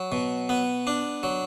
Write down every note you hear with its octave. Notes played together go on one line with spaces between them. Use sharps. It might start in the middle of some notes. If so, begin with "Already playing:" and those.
Already playing: F#3
B2
B3
D4
F#3